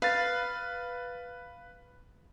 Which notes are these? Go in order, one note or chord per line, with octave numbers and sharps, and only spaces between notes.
B4 F5 A6